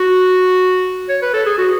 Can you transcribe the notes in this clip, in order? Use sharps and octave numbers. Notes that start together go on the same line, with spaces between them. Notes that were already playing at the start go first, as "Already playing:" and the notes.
Already playing: F#4
C#5
B4
A4
G#4
F#4